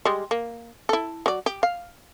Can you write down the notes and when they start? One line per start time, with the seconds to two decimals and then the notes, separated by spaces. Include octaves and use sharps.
0.05 G3 G#3
0.31 A#3
0.89 E4 A4
1.26 F#3 D5
1.46 G4
1.63 F5